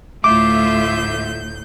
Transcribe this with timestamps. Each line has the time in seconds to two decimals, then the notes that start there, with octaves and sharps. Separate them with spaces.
0.24 D2 A2 A3 F4 E5 D6 G6